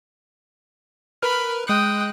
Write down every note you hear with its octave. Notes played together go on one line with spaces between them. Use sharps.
A#4 B4 B5 F6
G#3 G5 D#6 F#6